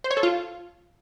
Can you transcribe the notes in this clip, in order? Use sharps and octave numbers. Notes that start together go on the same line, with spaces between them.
C5
C#5
A4
F4